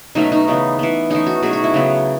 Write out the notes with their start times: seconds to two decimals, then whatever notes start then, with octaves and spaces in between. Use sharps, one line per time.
0.15 B2 F#3 A3 C#4 D#4
0.32 D#4
0.48 C#3 E3 B3
0.79 E3 B3
1.10 E3 A3 C#4 D#4
1.26 F#4
1.42 B2 F#3 A3 G#4
1.53 F#4
1.64 E4
1.74 C#3 F#3 B3